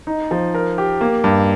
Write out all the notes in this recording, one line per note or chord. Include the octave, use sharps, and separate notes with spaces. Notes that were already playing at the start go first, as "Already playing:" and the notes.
D#4
F3
A#4
G4
A#3
G2